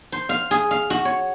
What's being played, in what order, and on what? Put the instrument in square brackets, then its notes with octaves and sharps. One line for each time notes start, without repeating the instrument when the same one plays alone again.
[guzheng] C5
F5
G#4
F5
F#4
C#5